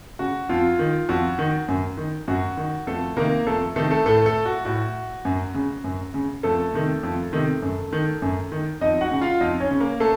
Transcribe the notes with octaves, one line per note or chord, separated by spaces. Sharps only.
C#3 F#4
F2 F4
D#3
F2 F#4
D#3
F#2
D#3
F#2 F#4
D#3
F2 A3 A4
C3 D#3 A#3 A#4
F2 A3 A4
C3 D#3 A3 A4
A3 A4
A2 A3 A4
A3 A4
F#4
A2 F#4
F#2
C#3
F#2
C#3
F2 A3 A4
C3 D#3
F2
C3 D#3
F#2
D#3
F#2
D#3
F2 D#4 D#5
F#4 F#5
C#3
F4 F5
F2 D#4 D#5
C#4 C#5
C#3
A#3 A#4
A3 A4